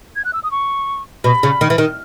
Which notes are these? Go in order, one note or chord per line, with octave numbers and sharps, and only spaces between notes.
G#6
F#6
E6
D#6
C#6
B2 B5
C#3
D#3
E3
D#3